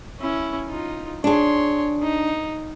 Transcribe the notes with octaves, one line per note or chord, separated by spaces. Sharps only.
C#4 E4
D#4 F4
D4 G#4 C#5 C6
D#4